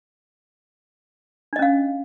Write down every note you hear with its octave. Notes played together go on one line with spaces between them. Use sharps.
C#4 D4 D#5 F5